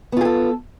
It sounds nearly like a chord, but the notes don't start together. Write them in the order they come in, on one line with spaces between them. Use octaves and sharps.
B3 F4 G#4 A4